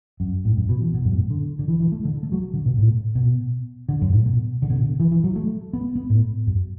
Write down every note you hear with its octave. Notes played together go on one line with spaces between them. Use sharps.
F#2
A2
F#2
B2
E3
B2
F#2
A2
D3
D3
E3
E3
A3
D3
A3
F#3
D3
B2
A2
B2
D3
F#2
A2
B2
D3
B2
D3
E3
E3
F#3
A3
B3
B3
A2
F#2